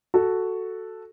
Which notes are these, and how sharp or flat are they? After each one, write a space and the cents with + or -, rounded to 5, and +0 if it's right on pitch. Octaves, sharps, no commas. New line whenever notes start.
F#4 +0 A4 +0